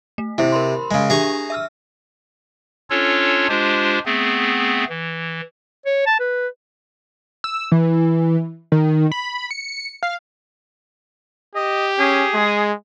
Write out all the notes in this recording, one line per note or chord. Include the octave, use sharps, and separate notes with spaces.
A3
C3 E4 G4 C5
A#4 B5 C6
C#3 G#3
D4 G4 G#4 E5 A#5 C#6
E5 E6 F6
C#4 D4 F4 A4 C#5
G#3 D4 F4 G4 C5
A3 B3 C4 G#4
E3
C#5
A5
B4
E6
E3
D#3
B5
C#7
F5
G4 D#5
C#4 G#4
G#3